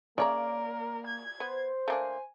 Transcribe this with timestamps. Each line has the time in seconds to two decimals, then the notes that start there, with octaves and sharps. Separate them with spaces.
0.18 C#3 A#3 A#4 C#5 D5 A#5
1.07 G#6
1.40 B3 C5
1.88 A3 A#3 D4 G#5